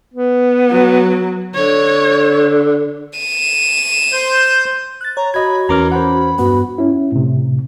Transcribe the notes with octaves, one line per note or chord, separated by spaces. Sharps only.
B3
F#3
D3 C#5
D#7 E7
C5 G6
F#6 A6
C#5 A#5
F#4 D#5 B5 G#6
E2 E3 C#4 A#4 A#5 D6 F6
C5 F#5 B5
G2 B3 F#4
C#4 E4
A2 C3